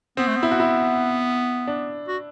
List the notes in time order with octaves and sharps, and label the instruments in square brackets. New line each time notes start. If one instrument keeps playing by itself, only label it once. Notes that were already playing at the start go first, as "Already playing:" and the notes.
[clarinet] B3 [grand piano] C4
[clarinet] A3
B3
[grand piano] E4
F#4
E4
D4
[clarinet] F#4